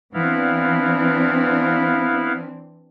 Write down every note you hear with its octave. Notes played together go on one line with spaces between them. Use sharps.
E3 B3 C4 D4 E4 F5